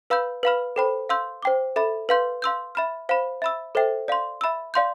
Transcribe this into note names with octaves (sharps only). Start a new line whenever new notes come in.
B4 F5 B5 E6 G6
B4 F5 B5 F6
A4 C5 G5 B5
F5 C6 E6 G6
C5 G5 D6
A4 E5 B5
B4 F5 C6 G6
F5 C6 E6 G6
E5 B5 F6
C5 F5 B5
E5 B5 E6
A4 C5 E5 G5
D5 F5 C6
E5 B5 E6
D5 F5 C6 G6